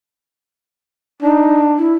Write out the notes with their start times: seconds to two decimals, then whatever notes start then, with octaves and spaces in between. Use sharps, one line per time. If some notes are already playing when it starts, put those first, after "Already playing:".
1.23 D4 D#4
1.78 E4